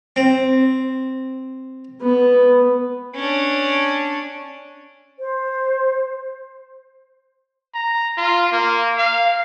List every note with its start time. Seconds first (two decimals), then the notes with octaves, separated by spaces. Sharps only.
0.16 C4
2.02 B3
3.15 C#4 D4
5.18 C5
7.74 A#5
8.18 F4
8.52 A#3
8.98 F5